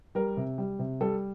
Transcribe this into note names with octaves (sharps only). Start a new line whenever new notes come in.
G3 A#4
C3
G3
C3
G3 A4